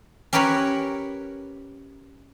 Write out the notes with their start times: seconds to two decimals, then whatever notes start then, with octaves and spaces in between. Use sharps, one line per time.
0.33 C#4 G4 A#4 B4 C#5 B5